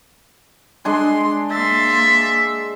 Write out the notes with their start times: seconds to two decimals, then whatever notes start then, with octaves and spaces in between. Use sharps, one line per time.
0.85 G#3 D4 G#5 C6
1.51 A#3 E5 C6 A6